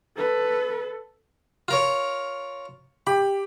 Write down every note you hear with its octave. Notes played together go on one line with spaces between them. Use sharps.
A4 B4
F4 A#4 C#5
G4 B5